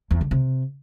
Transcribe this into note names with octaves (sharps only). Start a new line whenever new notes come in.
E2
D3
C3